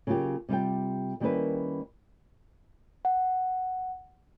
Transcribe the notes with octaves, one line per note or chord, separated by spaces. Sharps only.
C#3 F#3 A#3 F4 G4
C3 G3 F4 G5
D#3 G3 A#3 C#4 E4 B4
F#5